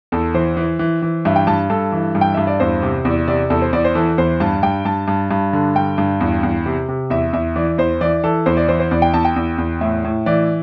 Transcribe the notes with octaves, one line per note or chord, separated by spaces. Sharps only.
E2 A4
E3 C5
E3
E3
E3
G2 E5
G5
G2 A5
G2 A4
E3
G2
G5
G2 E5
D5
E2 C5
C3
E2 D5
C3 D5
E2 A4
C5
E2 D5
C5
E3 A4
E2 C5
G2 A5
G2 G5
G2 A5
G2
G2
D3
G2 G5
G2
E2
E2
C3
C3
E2 E5
E2 E5
E3 D5
E2 C5
E3 D5
E3 A4
E2 C5
D5
E3 C5
C5
E2 D5
G5
E2 A5
G5
E2
E2
A2 E5
A2
E3 D5